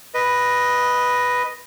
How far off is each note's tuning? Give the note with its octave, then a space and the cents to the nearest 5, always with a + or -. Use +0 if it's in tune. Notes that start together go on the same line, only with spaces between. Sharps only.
B4 +0 D#5 +0